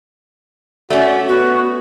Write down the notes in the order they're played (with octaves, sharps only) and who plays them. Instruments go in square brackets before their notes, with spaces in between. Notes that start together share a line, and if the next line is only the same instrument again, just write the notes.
[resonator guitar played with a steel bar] A3 C#4 [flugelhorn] F#4 [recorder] D5
[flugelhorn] B3 [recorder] F#4